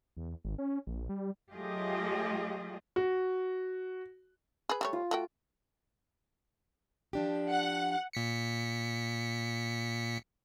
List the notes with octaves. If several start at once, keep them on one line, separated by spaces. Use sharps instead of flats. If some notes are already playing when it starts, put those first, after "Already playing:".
E2
G#1
C#4
A#1
G3
F#3 A3 F4 G4 G#4 D#5
F#4
G#4 B4
G3 A3 C#5
F4
A3 F#4 G5
F3 D4 G4
F#5
A#2 B6 C#7